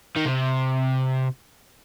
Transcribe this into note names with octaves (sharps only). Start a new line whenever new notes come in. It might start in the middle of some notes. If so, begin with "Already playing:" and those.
D#3
C3